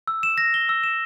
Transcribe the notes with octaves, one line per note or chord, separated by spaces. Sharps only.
E6
E7
A#6
G7
E6
E7